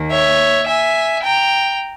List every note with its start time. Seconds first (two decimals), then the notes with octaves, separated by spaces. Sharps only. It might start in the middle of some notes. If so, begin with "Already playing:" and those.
Already playing: D#2 D#3 A#3
0.10 C#5 E5
0.67 E5 G#5
1.23 G5 A#5